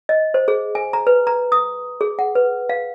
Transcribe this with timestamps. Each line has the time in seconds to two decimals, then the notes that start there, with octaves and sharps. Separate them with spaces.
0.09 D#5
0.34 C5
0.48 G#4
0.75 G#5
0.93 A#5
1.07 B4
1.27 A#5
1.52 D#6
2.01 G#4
2.19 F#5
2.35 B4
2.69 F5